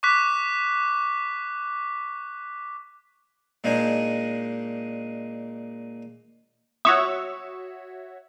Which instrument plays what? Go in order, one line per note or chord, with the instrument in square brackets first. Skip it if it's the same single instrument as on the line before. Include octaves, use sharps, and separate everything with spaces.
[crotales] C#6 D6 F#6 B6
[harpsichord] A#2 G#3 D4 D#4 C5 G#5
[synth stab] F#4 C#5 E5 [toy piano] D#6